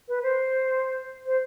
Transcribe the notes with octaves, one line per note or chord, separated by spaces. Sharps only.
B4
C5
C5